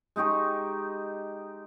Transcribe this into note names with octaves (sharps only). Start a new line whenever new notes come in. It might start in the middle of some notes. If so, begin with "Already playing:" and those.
G#3 D#4 G4 C#6